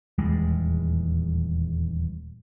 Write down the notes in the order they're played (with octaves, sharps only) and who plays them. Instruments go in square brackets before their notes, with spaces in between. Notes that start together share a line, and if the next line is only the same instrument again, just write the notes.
[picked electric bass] D#1 E2 G3 G#3